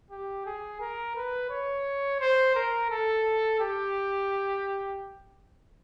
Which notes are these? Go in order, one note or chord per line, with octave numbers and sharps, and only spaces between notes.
G4
G#4
A#4
B4
C#5
C5
A#4
A4
G4